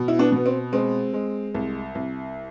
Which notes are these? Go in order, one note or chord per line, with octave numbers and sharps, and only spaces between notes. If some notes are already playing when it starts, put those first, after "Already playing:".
Already playing: B2
E4
B3 D4
B2 B3
C4
G#3 C4
G#3
C2
C2